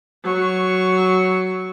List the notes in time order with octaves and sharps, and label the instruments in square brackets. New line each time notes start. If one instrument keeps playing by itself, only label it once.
[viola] F#3 C#6